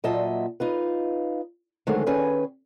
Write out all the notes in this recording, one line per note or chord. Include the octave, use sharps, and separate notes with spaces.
A#2 F#3 F4 D#5 E5 A5
D#4 F4 B4
D3 D#3 F#3 G#3 A3 C4
D#3 C#4 G#4 B4